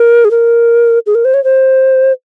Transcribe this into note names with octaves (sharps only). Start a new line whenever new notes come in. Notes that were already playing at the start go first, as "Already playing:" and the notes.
Already playing: A#4
G#4
A#4
G#4
A#4
C5
C#5
C5